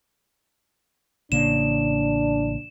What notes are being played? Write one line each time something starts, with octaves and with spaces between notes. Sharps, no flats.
A1 C#3 A#3 D4 E7